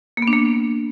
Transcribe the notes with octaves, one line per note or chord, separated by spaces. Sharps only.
A#3
B3
D4
A#3